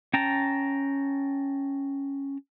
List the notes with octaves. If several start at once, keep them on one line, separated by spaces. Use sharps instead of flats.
C#4 G5 A5 A#5